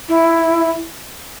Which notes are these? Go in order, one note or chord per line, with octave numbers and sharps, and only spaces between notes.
E4